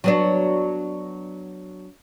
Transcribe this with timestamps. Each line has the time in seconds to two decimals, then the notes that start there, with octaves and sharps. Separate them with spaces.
0.04 F#3 B3 D4